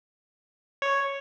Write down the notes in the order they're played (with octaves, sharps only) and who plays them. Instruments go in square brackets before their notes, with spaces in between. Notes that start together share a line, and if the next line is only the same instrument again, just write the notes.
[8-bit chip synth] C#5